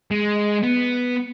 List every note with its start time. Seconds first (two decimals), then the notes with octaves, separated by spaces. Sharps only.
0.11 G#3
0.63 B3